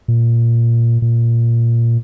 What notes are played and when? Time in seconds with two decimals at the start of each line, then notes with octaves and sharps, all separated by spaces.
0.08 A#2
1.02 A#2